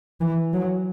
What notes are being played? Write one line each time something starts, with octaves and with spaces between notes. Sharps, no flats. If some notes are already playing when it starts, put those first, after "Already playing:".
E3
F#3